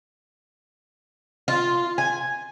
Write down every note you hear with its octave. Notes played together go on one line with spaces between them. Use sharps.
F4
G#5